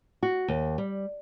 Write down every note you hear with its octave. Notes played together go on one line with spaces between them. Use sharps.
F#4
D#2
G3